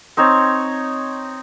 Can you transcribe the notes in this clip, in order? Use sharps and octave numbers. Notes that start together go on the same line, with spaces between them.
C4 D#4 C5 C#5